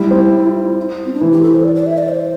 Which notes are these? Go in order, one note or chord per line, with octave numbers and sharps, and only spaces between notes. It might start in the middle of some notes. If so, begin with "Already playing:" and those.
Already playing: G3 E4
C4
C4
D4
E3 E4
G4
A4
C5
D5
D5
E5
D5
C5